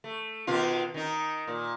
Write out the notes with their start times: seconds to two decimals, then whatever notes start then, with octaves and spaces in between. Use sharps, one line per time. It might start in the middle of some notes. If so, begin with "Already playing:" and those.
0.04 A3
0.47 B2 D#3 F4
0.94 D#3 D#4
1.47 A#2